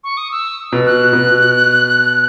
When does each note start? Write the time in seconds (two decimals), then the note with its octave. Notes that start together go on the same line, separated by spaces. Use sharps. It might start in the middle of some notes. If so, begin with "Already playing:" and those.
0.04 C#6
0.17 D#6
0.32 E6
0.72 B2
0.86 F#6
1.13 B2